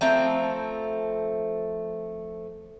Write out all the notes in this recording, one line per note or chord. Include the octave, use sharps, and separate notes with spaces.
F3 A3 C4 A#5